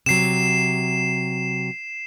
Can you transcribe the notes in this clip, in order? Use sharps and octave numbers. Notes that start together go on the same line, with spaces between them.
C3 F#3 C7 E7